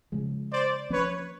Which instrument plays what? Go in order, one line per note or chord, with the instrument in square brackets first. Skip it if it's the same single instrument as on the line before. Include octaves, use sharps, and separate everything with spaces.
[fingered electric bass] C#3 F3 G#3
[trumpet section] C5 D5
[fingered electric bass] F3 A#3 C#4 [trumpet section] B4 C#5